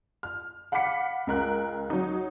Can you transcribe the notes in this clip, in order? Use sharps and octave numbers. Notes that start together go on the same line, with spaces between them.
F6
F5 F#5 B5 D6 B6 C#7
C#2 A#4 F#6
F#3 D#4